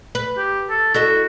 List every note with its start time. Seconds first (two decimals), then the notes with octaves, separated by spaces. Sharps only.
0.15 B4
0.37 G4
0.70 A4
0.94 E4 F#4 A4 D#5